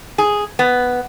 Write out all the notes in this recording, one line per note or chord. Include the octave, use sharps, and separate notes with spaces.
G#4
B3